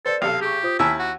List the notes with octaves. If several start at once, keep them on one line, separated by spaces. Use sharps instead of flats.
A4 B4 C5 D5
B1 C3 A4 F5 F7
G4 G#4 C#6
F4 C5 D#6
D#2 E4 E5 G#5 A5 E6 F6
F#4 F#5